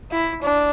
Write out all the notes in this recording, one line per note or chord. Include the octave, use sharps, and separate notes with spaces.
E4
D4